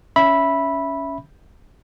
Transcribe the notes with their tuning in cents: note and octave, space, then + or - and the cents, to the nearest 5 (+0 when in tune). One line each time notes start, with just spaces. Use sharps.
C#4 +15 E5 +0 B5 -10